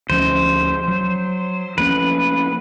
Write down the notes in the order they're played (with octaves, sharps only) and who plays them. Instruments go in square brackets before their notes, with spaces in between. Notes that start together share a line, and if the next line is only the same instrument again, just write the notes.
[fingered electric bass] D2 F3 C#4 [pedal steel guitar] C5
[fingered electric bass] F#3
[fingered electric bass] F3 A#3 C#4 [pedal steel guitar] B4